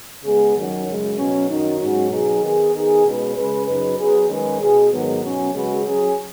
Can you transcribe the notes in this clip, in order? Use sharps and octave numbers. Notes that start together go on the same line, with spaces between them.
C#3 G#3 B3 G#4
F#2 D#3 F#3 C#4
F#2 C#3 G#3
B2 F#3 C#4
F#2 D#3 F#3 D#4
G#2 F#3 C#4 F#4
B2 F#3 D#4 G#4
D#3 B3 G#4
D#3 B3 D#4 G#4
B2 G#3 C#4 B4
C#3 G#3 C#4 B4
F#2 C#3 F#3 D#4 B4
F#3 B3 G#4 B4
D#3 G#3 C#4 G#4 B4
B2 B3 G#4
G#2 D#3 F#3 B3
B2 F#3 C#4
C#3 G#3 C#4 F#4 B4
F#3 C#4 G#4